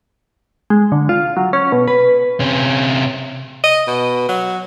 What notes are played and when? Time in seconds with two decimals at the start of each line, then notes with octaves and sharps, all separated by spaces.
0.70 G#3
0.92 D3
1.09 F4
1.37 F#3
1.53 C#4
1.72 B2
1.88 B4
2.40 C3 C#4
3.63 D#5
3.87 B2
4.29 F#3